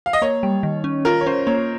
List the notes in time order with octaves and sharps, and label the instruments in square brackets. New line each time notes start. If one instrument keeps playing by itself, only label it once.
[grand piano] F5
D#5
[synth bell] A#3 [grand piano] C#5
[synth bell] G3
D#3
C#4
[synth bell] F4 [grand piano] A#4
[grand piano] C#5
[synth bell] C#4 [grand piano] C5
[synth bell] A#3 [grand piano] C#5